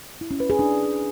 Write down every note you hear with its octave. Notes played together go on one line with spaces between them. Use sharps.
E4
C#4
B4
G#4
D4